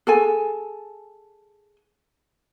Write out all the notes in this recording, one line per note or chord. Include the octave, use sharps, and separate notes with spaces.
G#4 A4 G#5